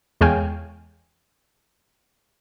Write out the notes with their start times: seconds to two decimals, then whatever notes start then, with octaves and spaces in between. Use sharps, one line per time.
0.21 E2 G#3 C#5 F5 G5 G#5